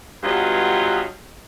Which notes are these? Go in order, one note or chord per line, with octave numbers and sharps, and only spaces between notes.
G2 F#3 B3 F4 C#5 D#5